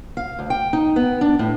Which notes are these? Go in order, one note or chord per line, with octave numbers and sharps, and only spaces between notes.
F5
D2
G5
D#4
B3
D4
A2